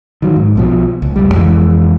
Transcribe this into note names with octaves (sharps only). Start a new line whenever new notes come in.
D#3 F#3
G#2
B1 B2 F3
C#2
F1 G3
F2 E3 F#3 G#3